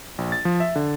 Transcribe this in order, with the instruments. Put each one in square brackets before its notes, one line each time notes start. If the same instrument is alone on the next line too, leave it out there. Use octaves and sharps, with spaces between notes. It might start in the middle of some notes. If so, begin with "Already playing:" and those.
[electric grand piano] A#1
A6
F3
E5
D3